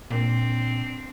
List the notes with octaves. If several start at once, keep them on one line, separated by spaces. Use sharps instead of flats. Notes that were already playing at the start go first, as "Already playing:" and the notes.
A#2 C4 D4